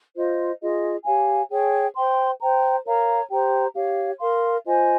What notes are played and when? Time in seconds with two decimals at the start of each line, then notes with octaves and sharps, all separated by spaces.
0.15 F4 C5 D#5
0.61 F4 G#4 D#5
1.05 G4 C#5 F5 G#5
1.49 G#4 C#5 G5
1.95 C5 G5 C6
2.40 C5 G5 A#5
2.86 A#4 C#5 F5 A#5
3.30 G4 C5 G5 A#5
3.75 G4 C#5 F5
4.20 A#4 F5 C6
4.65 F4 C5 D#5 G#5